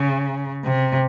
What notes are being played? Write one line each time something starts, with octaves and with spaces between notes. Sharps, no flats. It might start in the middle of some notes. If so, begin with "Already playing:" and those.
Already playing: C#3
C3